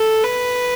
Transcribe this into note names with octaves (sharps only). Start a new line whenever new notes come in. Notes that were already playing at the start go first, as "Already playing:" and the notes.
Already playing: A4
B4